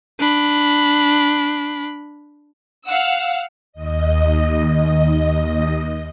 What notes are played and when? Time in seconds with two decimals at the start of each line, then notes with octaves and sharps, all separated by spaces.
0.19 D4 B5
2.88 F5 F#5 E6
3.73 D#2 D#5